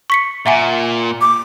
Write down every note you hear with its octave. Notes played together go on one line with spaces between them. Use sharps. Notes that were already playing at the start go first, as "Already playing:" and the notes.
C#6 B6 C#7
A#2 E5 F#5 G#5
D6